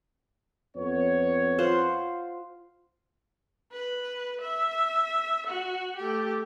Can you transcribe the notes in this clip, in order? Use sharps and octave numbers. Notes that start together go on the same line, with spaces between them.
F2 B3 C#5
F4 C5 F#5
B4
E5
F#4
A3 G4